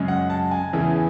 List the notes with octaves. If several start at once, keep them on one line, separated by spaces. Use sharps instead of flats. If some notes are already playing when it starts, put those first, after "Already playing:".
Already playing: F#2 C#3 G#3
F#5
A5
G#5
E2 C#3 E3